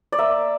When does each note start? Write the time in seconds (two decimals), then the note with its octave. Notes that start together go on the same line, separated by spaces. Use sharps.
0.12 D5
0.19 A#3 E5